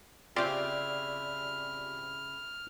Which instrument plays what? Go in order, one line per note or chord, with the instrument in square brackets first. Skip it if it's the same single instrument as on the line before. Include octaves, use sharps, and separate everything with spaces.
[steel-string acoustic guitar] C#3 E4 [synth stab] C4 F4 G4 [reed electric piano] D5 [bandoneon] F6